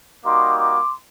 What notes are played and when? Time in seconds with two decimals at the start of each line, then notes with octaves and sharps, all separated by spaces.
0.25 G3 A#3 D#4 F#4 C6 D6
0.57 C6 D6